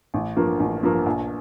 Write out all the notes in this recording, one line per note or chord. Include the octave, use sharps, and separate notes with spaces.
A1
G2 F3 A#3
A1
G2 F3 A#3
A#1